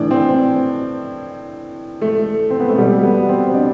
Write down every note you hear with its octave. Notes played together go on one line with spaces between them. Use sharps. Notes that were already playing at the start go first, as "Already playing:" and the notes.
Already playing: A2 E3 D4
C4
A3
C4
B3
A3
B2 G3
B3
C4
D4